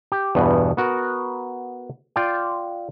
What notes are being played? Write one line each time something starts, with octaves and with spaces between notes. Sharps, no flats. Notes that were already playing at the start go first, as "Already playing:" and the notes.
G4
E2 G2 B2 B3
B3 F#4 A#4
F4 D5 G5